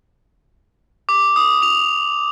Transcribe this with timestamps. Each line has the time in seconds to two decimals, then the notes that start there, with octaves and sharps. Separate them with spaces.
1.09 D6
1.36 D#6
1.62 F7